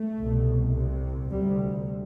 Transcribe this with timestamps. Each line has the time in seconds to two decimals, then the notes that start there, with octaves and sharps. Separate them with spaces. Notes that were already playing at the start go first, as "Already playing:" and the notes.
Already playing: A3
0.18 C2 B2
0.75 C2 C3
1.31 D2 C3 G3